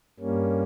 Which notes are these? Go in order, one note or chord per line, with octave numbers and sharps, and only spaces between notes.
G2 G3 A#3 C#4